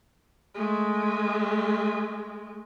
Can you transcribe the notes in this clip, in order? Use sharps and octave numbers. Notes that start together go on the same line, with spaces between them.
G#3 A3